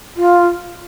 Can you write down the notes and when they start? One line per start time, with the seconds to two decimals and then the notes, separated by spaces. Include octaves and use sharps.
0.17 F4